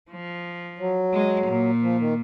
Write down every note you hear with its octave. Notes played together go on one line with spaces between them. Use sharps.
F3
F#3
G#3
A#2
F3
D#3